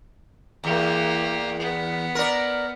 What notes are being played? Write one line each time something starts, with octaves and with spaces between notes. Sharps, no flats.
E2 A#3 G4
B3
A#4 D5